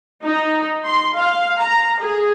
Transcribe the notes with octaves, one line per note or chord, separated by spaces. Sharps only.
D#4
C6
F5
A#5
G#4